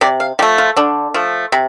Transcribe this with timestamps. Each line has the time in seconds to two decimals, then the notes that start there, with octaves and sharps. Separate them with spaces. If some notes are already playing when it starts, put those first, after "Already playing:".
0.01 C3 D5
0.20 F5
0.39 F3 G4
0.42 A3
0.58 F4
0.76 D3 D4
1.14 F3 A3
1.52 C3